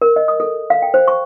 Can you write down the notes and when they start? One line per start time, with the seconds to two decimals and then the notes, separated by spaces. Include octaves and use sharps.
0.02 A#4
0.16 D#5
0.28 D#6
0.40 A4
0.70 F5
0.82 G5
0.94 C5
1.08 C#6